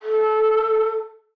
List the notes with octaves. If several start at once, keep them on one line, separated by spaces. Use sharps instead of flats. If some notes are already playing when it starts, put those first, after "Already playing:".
A4